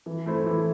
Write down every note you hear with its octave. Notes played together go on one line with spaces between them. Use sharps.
E3
A3 E4 C5
E3